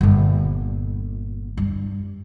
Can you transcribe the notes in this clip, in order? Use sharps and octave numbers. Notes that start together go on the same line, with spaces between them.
G1 A#2
G2